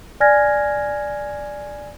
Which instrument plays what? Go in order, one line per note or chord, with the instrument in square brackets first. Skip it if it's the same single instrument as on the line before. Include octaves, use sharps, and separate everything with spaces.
[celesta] D5 G#5 F6 G#6 A#6